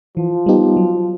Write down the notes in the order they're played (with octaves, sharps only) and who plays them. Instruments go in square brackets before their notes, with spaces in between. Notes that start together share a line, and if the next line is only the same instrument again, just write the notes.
[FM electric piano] E3 [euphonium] F3
[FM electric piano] G3 B3 D#4 G4
F#3